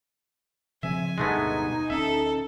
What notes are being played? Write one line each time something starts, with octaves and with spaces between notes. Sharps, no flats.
C#3 F3 C4 E5 G#5
D1 G2 B2 G#3 A3 B3 D#4
D1 C#4 A4 E5